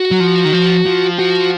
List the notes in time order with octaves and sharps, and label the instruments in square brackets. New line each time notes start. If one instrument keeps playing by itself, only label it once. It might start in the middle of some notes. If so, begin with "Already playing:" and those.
Already playing: [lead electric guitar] F#4
[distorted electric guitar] F#3
F3
D#3
F3
F3
[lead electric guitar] F#4